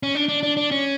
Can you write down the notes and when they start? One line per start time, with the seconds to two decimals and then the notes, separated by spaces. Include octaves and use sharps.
0.03 C#4
0.15 D4
0.28 D4
0.43 D4
0.57 D4
0.71 C#4